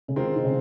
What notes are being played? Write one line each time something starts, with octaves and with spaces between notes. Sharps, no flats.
C#3
D#3 G#3 C4 F4 A#4
D#3
C#3